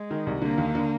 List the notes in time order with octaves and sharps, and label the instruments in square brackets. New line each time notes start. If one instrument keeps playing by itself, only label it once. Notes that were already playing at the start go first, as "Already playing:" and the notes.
Already playing: [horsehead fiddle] G#3
[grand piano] D#3
C2
[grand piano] D3 [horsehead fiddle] A#3
[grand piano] D#2
D3